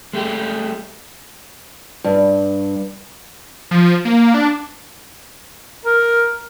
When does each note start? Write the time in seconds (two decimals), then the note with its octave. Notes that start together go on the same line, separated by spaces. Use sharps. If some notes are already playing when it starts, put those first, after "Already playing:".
0.13 G#3 A3 G4
2.04 G2
3.71 F3
4.05 A#3
4.34 D4
5.86 A#4